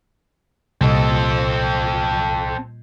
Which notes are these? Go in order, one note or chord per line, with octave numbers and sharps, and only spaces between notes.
C2 A#2 G3 C4 A4 D#5